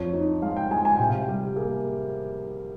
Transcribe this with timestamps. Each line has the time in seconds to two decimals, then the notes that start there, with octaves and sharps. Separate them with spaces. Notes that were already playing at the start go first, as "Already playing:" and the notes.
Already playing: F2 C#5
0.13 D#4
0.42 G#3 F5
0.57 G5
0.71 G#3 G#5
0.85 G#5
0.97 C3 G5
1.09 F5
1.21 G5
1.28 G3
1.56 A#3 G#4